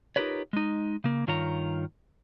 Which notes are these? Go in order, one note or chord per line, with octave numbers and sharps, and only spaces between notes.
D#4 F4 G4 A#4 B4 C#5
G#3 D#4
C#3 A#3
G2 D#3 F4 C#5 A#5